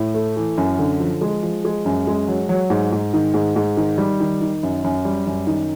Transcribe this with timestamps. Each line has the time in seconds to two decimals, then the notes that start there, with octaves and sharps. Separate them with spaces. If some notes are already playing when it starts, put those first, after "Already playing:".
Already playing: A2
0.14 A3
0.36 E3
0.57 F#2
0.79 D3
1.00 F3
1.21 G#3
1.43 F3
1.65 G#3
1.85 F#2
2.07 G#3
2.28 F#3
2.49 F#3
2.70 G#2
2.92 G#2
3.13 D#3
3.34 G#2
3.56 G#2
3.77 D#3
3.98 G3
4.20 D#3
4.41 D#3
4.63 F#2
4.84 F#2
5.05 G3
5.27 F#2
5.47 D#3